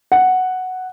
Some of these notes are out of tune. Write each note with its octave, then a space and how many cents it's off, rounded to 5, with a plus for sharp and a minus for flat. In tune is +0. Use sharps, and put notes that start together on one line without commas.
F#5 +0